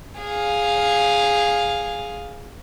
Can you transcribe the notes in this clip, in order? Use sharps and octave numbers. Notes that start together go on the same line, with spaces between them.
G#4 F5